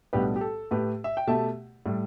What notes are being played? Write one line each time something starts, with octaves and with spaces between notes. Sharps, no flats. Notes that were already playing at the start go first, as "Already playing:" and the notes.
B1 A2 G3 B3 D4 G4 B4
G4
A4
A2 A3 G4 B4
E5
G5
B2 A3 G4 E5 A5
A2 G3